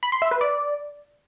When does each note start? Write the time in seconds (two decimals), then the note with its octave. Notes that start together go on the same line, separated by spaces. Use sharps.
0.03 B5
0.12 C6
0.22 E5
0.31 B4
0.41 D5